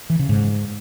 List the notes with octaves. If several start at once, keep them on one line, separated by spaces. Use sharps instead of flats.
E3
C#3
G#2